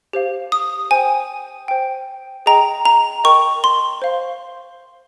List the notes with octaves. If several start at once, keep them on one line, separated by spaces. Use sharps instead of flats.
G4 C5 F5
D#6
C5 G5 G#5
C5 G5
G#4 D#5 G5 A#5
A#5
A#4 D#5 G5 C#6
C6
C5 F5